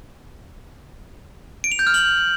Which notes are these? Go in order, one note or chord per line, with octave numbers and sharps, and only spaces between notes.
D7
F7
G6
F6
F#7